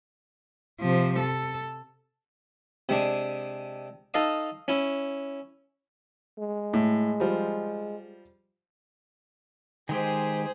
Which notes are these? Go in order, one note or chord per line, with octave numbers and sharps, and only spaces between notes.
C3 F3
A4
C3 G#3 D4
D#4 A4 D#5 F5 D#6
C#4 E4
G#3
A2
F3 G3
D#3 G#3 G4 G#4 C5